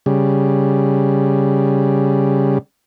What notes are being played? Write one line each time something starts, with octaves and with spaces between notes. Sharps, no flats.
C#3 G3